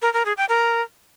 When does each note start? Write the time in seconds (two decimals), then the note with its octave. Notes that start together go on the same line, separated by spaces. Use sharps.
0.02 A#4
0.14 A#4
0.26 G#4
0.37 G5
0.49 A#4